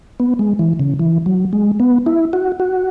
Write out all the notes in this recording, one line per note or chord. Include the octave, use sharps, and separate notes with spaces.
B3
G#3
E3
C#3
E3
F#3
G#3
B3
E4
F#4
F#4